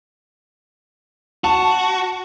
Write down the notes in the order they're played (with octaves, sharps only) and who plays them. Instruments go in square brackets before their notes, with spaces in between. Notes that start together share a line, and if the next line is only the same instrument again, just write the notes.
[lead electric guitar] F#4 [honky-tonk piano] A5